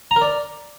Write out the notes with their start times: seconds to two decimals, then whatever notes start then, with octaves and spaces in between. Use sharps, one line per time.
0.11 A#5
0.16 A#4
0.22 D5